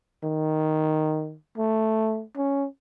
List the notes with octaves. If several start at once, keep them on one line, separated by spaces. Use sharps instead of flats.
D#3
A3
C#4